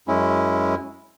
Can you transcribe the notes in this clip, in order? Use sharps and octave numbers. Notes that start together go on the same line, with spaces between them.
F#2 G#3 C#4 E4